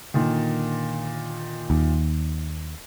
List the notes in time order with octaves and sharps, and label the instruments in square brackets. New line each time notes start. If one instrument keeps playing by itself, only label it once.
[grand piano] A#2 D3 D#3
[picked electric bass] D#2